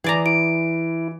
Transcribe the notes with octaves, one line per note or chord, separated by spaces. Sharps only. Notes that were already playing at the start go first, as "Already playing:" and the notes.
E3 G#4 D5 A#5
E4 D7